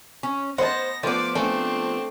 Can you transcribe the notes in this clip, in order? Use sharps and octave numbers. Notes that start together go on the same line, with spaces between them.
C#4
B3 C5 D#5 F#5 A5 A#6
F3 A3 B3 C5 D5 D6
A3 C4 D4 G#4 A5